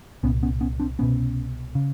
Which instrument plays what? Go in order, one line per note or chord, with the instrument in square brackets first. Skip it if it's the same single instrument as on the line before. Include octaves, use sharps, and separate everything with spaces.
[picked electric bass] C2 A#2 B3 C#4
B3 C#4
B3 C#4
C4 D4
C2 B2 B3 C#4
C#3